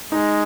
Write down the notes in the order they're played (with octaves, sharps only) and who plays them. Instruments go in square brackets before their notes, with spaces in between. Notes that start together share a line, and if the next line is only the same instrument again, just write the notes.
[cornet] G#3 [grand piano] D#4